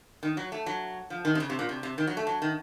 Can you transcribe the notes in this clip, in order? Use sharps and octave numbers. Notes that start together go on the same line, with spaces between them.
D#3
F#3
A3
F#3
F3
D#3
C3
C#3
C3
A#2
C3
C3
D#3
F#3
A3
F#3
D#3